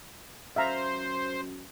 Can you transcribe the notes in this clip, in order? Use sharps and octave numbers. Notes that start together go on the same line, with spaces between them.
F#2 C5 E5 F5 A#5